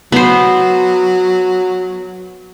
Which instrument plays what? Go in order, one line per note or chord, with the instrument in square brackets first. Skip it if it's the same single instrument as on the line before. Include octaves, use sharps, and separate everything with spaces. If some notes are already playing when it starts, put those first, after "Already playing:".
[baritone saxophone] F#3 [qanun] B3 C5